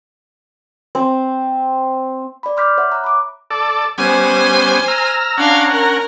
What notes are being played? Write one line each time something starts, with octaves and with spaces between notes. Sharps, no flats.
C4
D5 B5
C6 D6 F6 G6 B6
C#5 E5 F#5
A#5 F#6
B5 D6
A4 D5
G3 B3 C#4 C5 G#5
A#5 E6 F6
C#4 D4 F5 F#5 A#5
A#4